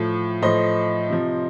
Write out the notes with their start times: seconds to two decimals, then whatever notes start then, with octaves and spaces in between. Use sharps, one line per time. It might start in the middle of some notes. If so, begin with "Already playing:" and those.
Already playing: A2 F3
0.42 A2 F3 C5 D#5
1.10 C3 F3